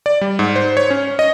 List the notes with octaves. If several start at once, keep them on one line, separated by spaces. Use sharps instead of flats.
D5
G3
G#2
C5
C#5
C#4
D#5